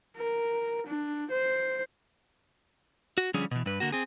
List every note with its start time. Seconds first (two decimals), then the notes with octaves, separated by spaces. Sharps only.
0.17 A#4
0.86 D4
1.31 C5
3.18 F#4
3.34 D3 F3 G3 C#4 G#4
3.51 B2 E3
3.66 G2 B4
3.80 D3 A#3 F#4
3.92 C4 G#4